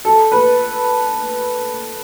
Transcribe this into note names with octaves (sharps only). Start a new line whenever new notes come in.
A4
B4